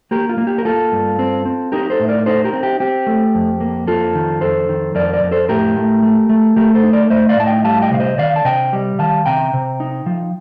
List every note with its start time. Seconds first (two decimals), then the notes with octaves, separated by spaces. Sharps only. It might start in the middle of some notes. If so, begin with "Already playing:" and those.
0.11 A#3 G4 A#4
0.29 F4
0.38 A#3
0.47 G4
0.58 A#4
0.65 A#3 F4 A4
0.92 G2
1.19 C4
1.45 C4
1.72 D#4 G4 A#4
1.90 A4 C5
2.00 A2
2.09 A#4 D5
2.26 D#4 A4 C5
2.44 G4 A#4
2.53 C4
2.63 G4
2.80 C4 G4
3.07 A3
3.35 F2
3.60 A#3
3.88 F2 F4 A4
4.15 D#3
4.41 F2 A4 C5
4.69 D#3
4.95 F2 A#4 D5
5.13 A#4 D5
5.23 F2
5.31 A4 C5
5.49 A2 G4 A#4
5.76 A3
6.03 A3
6.29 A3
6.56 A3 G4 A#4
6.74 A4 C5
6.84 D#4
6.93 A#4 D5
7.10 A3 C5 D#5
7.29 D5 F5
7.37 A2 A5
7.46 D#5 G5
7.64 G3 F5 A5
7.82 D#5 G5
7.91 C3 F5
8.00 C5 D#5
8.18 D#3 D5 F5
8.36 A5
8.45 C3 D#5 G5
8.73 G3
8.99 D#3 F5 A5
9.26 C3 G5 A#5
9.53 C3
9.80 D#4
10.06 F3